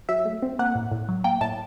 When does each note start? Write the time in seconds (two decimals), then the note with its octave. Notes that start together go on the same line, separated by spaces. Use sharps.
0.09 F#3 E5
0.25 A3
0.42 C4
0.59 A#3 F#5
0.75 A2
0.91 A2
1.08 F#3
1.24 A#3 G5
1.41 A2 A5